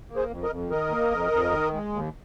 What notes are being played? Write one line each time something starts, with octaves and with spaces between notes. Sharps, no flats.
A#3
G#4 C5
F2
A#4 D#5
F2
D#3 A#4 D#5
A#3
F2
F2
D#3
G#3
D#2